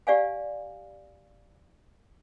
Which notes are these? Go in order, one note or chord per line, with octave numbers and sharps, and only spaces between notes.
G4 D5 F5 G#5